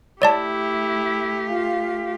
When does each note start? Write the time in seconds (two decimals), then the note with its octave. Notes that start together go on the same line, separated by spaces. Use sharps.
0.22 A3 E4 G4 C#5 D5 A5
1.48 F4 F5